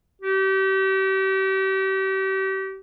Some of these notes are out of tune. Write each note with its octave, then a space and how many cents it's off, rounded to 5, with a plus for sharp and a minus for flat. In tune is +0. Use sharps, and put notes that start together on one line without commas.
G4 -35